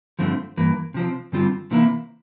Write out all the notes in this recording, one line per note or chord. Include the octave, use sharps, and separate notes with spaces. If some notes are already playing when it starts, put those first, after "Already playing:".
G2 D3 F3 A3 C4
G2 E3 A#3
C3 F3 C4
G2 D3 G3 C4 F4
C3 E3 A#3 E4